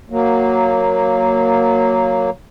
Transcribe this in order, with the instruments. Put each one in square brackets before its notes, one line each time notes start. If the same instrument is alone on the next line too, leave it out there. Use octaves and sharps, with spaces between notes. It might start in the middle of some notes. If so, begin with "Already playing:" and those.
[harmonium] F#3 A#3